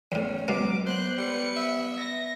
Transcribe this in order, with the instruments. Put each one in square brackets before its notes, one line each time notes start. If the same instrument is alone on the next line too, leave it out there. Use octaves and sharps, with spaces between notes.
[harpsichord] E2 A2 [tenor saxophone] C#4
[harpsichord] B2 G#3 A#3 [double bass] F#3 [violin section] D6
[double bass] B3 [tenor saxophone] C5 [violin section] F#6
[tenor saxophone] G3 [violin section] B4 C#7
[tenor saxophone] E5
[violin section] A#6